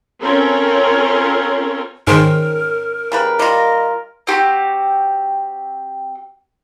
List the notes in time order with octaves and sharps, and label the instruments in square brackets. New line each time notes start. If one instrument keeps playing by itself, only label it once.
[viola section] C4 C#4 F4 A4 A#4 C#5
[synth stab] G#2 D#3 [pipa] C#4 C5 G5 [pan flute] A#4
[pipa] C#3 G3 B4 [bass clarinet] A#4
[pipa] G3 F4 [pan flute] D#5
[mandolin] C4 F#4 G4